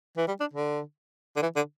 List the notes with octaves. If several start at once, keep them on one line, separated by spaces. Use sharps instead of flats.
E3
G3
D4
D3
D3
E3
D3